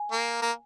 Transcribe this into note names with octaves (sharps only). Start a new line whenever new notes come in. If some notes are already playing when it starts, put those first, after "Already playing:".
Already playing: G#5
A#3
A#3